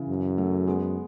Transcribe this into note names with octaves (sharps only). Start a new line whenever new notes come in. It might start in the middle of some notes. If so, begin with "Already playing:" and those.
Already playing: C#3 E3
F#2
F#3 A3
G#3 B3